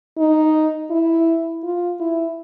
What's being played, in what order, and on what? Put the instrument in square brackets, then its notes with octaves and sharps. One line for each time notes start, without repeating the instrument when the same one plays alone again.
[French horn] D#4
E4
F4
E4